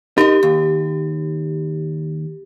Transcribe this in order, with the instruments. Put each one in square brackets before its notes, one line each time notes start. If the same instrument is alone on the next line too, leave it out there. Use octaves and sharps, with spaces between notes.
[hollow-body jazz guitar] D#4 A#4 D#5 [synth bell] G4
[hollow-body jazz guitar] D#2